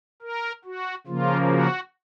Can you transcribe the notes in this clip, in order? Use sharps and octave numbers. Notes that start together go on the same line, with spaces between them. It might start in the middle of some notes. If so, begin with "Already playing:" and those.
A#4
F#4
C#3 F3 A#3 F4
F#4